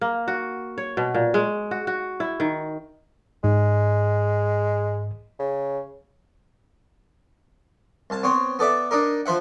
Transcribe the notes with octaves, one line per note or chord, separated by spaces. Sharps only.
A#3
F#4
C#5
B2
A#2
G#3
F#4
F#4
E4
D#3
G#2 G#3
C#3
C2 A5
B3 C4 C#5
B3 A4 D5 E5
D4 D#4 A#4
F3 C5 E5 F#5